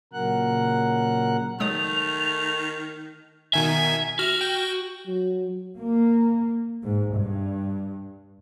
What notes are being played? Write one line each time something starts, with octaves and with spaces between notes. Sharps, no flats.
A#2 C#3 F#3 A#4 F#5 F#6
D#3 F#3 G#3 A3 D#6 F7
B2 D#3 E5 G#5
F#4 F6
G5 G6
F#3
A#3
G#2
G2